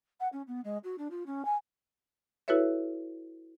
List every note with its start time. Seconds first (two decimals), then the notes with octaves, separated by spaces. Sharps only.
0.20 F#5
0.32 C#4
0.47 B3
0.64 G#3
0.84 F#4
0.98 D4
1.11 F4
1.26 C#4
1.45 G#5
2.48 E4 F#4 A4 B4 C#5 E5